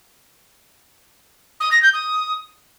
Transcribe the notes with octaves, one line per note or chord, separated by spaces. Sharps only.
D#6
A#6
G6
D#6